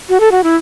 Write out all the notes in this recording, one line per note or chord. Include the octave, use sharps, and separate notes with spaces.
F#4
A4
F#4
E4